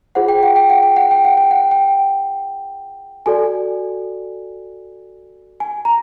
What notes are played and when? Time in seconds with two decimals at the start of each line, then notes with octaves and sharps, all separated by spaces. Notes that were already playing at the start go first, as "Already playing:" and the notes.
0.15 F4 G#4 C5 F#5
0.28 G5
0.43 F#5
0.56 G5
0.70 F#5
0.83 G5
0.96 F#5
1.11 G5
1.25 F#5
1.37 G5
1.51 F#5
1.71 G5
3.26 F#4 A4 D5 G#5
5.60 G#5
5.85 A#5